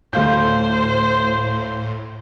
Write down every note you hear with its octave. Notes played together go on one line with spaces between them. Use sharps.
D2 A2 C5 F5 G6